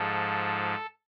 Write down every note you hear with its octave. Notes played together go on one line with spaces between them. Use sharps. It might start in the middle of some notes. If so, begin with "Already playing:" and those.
Already playing: G#2 F3 A4